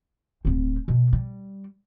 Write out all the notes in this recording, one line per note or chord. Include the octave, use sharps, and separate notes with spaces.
D1 C4
B2
G3